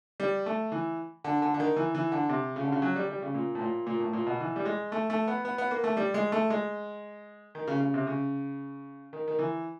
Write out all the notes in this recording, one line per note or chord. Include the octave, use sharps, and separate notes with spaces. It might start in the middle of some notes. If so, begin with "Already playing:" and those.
G3
A3
E3
D3
D3
D3
D#3
E3
E3
D3
C3
C#3
D3
C#3
F#3
G3
G3
C#3
A#2
A2
A#2
A#2
A2
A#2
B2
E3
G3
G#3
A3
A3
B3
B3
B3
A#3
A3
G3
G#3
A3
G#3
D#3
C#3
C#3
C3
C#3
D#3
D#3
E3